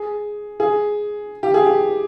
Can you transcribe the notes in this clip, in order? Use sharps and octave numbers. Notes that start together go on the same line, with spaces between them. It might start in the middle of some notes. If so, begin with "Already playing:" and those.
Already playing: G#4
G#4
G4
G#4
G4